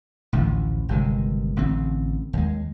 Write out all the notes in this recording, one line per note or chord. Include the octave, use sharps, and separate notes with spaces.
A1 D2 A2 F3
G1 C3 D#3 G#3
A1 D3 C4
D#2 G#3